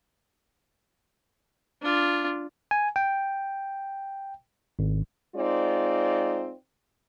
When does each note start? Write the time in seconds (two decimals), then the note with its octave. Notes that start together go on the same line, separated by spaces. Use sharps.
1.82 D4 F4
2.71 G#5
2.96 G5
4.79 G#1
5.35 G#3 C4 D#4 F4 D5